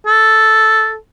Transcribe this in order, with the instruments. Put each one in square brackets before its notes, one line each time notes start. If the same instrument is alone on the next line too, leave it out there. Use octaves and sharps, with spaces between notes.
[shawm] A4